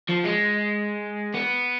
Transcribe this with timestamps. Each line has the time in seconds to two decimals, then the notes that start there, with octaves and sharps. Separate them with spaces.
0.09 F3
0.24 G#3
1.35 B3